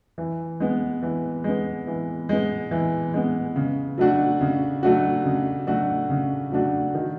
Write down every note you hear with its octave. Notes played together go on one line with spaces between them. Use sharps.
E3
G#3 B3
E3
G#3 B3
E3
G#3 B3
E3
G#3 B3
C#3
F#3 A3 D4 F#4
C#3
F#3 A3 D4 F#4
C#3
F#3 A3 D4 F#4
C#3
F#3 A3 D4 F#4
D#3